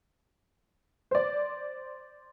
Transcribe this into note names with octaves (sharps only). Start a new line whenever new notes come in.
C5 D5